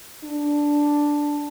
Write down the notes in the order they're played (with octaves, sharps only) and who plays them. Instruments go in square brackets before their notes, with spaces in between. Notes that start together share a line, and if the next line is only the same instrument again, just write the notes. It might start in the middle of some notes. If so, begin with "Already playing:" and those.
[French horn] D4